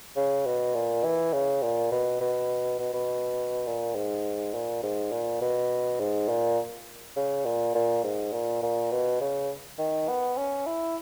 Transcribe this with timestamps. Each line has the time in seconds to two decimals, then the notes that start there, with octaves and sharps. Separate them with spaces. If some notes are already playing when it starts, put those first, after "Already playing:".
0.16 C#3
0.46 B2
0.75 A#2
1.04 E3
1.33 C#3
1.62 A#2
1.92 B2
2.21 B2
2.79 B2
2.94 B2
3.66 A#2
3.96 G#2
4.54 A#2
4.83 G#2
5.12 A#2
5.41 B2
6.00 G#2
6.29 A#2
7.16 C#3
7.45 A#2
7.75 A#2
8.04 G#2
8.33 A#2
8.62 A#2
8.91 B2
9.21 C#3
9.79 D#3
10.08 B3
10.37 C#4
10.66 E4